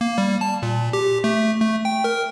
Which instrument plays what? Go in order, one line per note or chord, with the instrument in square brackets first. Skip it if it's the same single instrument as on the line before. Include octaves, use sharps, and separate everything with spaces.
[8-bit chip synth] A#3
G3
A5
A#2
G4
A3
A3
G5
A#4